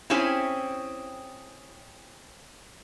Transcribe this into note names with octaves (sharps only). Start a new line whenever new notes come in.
C4 C#4 E4 G4 G#4